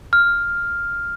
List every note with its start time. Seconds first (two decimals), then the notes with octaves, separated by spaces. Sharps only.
0.13 F6